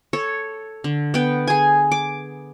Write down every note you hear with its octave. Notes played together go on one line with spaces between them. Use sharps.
A4 C#5
D3
B3 G5
G#4 G#5
D6